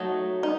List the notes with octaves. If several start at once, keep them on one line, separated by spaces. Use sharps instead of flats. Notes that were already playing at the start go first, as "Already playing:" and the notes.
Already playing: F#3 A3 D#4
D#4